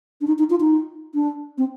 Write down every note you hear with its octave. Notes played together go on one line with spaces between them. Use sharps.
D4
D#4
D#4
F4
D#4
D4
C4